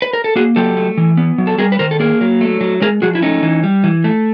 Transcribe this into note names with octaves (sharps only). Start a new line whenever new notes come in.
B4
A#4
A4
A#3 F#4 G#4
F#3 G4 A4
A3
E3
B3
F#3
A4
G3 G#4 A#4
B4
D#3 A#4 C5
A4
A#3 G#4 A#4
F#3
A3
F#3
G#3 G#4 A#4
F3 F#4 G#4
E4
A3 C#4 D#4
E3
G3
E3
A3